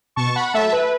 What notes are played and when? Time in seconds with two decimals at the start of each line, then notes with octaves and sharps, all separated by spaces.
0.16 B2 A5 C#6
0.35 F#5 B5
0.53 F#3 A3 E5 A5
0.72 B4